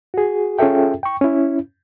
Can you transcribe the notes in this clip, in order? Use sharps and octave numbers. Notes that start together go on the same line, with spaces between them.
F#4 G#4
C#4 F4 G#4 A4 E5 G5
G5 C#6
C#4 E4